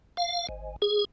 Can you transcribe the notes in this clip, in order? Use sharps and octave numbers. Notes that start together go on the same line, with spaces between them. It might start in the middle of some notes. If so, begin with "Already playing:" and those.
F5
G#1
G#4